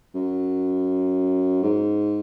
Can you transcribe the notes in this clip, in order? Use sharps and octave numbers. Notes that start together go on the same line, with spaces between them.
F#2
G#2